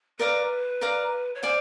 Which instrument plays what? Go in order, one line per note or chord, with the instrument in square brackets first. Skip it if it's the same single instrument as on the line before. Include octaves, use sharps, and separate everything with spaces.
[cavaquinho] A#4 D5 F5 A#5 [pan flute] B4
[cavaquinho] A#4 D5 F5 A#5
[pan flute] C#5
[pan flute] C5 [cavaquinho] D5 F5 G#5